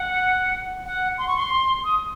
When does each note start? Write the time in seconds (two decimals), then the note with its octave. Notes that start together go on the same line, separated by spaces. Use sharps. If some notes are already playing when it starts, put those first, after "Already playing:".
Already playing: F#5
0.85 F#5
1.18 C6
1.27 C#6
1.37 C6
1.84 D#6